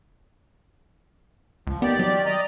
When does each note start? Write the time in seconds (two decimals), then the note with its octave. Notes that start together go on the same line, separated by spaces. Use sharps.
1.67 C#2 F3
1.82 D#3 B3 G4 D5
1.99 F#3
2.25 D5 D#5 A#5